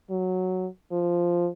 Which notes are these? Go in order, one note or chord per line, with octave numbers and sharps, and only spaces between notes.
F#3
F3